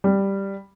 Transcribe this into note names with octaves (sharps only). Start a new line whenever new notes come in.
G3